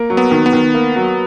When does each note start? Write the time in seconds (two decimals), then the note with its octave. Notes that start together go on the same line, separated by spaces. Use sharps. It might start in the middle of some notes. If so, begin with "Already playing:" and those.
Already playing: A#3
0.10 F#3
0.17 B3
0.31 D#3
0.46 B3
0.53 D#3
0.74 A#3
0.96 F#3